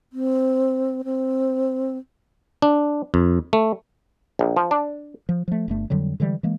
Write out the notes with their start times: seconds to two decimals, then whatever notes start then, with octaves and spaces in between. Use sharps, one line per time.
0.13 C4
1.05 C4
2.62 D4
3.14 F2
3.53 A3
4.39 A#1
4.57 F3
4.71 D4
5.29 F3
5.48 F3 A3
5.68 G1 G2 A3
5.90 F2 D3 F#3 G3
6.20 D3 E3 G3 G#3
6.43 E3 G#3 A#3